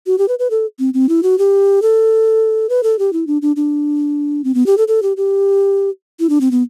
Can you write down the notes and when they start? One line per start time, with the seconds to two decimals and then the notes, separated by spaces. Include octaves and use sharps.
0.07 F#4
0.18 G4
0.28 B4
0.39 B4
0.50 A4
0.79 C4
0.94 C4
1.09 E4
1.23 F#4
1.38 G4
1.82 A4
2.69 B4
2.83 A4
2.99 G4
3.13 E4
3.27 D4
3.42 D4
3.56 D4
4.44 C4
4.54 B3
4.66 G4
4.78 A4
4.88 A4
5.02 G4
5.17 G4
6.19 E4
6.29 D4
6.41 C4
6.51 B3